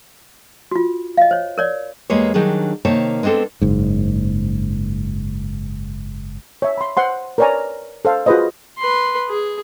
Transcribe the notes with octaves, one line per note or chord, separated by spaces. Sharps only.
F4 F#4
D#5 F5
C5 C#5
A#4 C#5 D5
E2 G#3 A#3 G4 C#5
D#3 F#3 G3 D4 G#4
C3 D#3 A#3 C#5 A5
G#3 B3 C4 D4 A4
F#1 G#2
C#5 E5
B5 C6
C5 F#5 C6
A#4 B4 C#5 D5 G#5 A#5
A4 C5 F5
F4 F#4 G#4 B4 C5 D#5
B4 C6
G#4